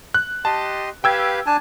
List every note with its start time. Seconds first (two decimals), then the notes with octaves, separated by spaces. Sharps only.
0.14 F#6
0.45 G4 D#5 A5 C6
1.04 G4 B4 F5 G5 E6 G#6
1.46 D4 G#5 A5